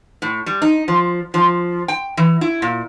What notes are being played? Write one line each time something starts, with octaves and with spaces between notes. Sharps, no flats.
A2
G3
D#4
F3
F3
G5
E3
E4
A#2